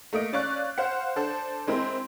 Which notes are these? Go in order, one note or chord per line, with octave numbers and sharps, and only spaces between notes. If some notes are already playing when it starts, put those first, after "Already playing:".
A3 A#3 D#5 D7
C#4 D5 F5 C#6 F#6
C5 F5 F#5
D4 A4 C5
G#3 C4 E4 A#4